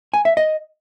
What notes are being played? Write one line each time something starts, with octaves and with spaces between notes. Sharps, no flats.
G#5
E5
D#5